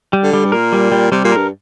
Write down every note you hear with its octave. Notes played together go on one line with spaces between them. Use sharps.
G3
D3
G3
G2
A#2 A#4
G3
G3
C3 G3
A#2
G2 A#4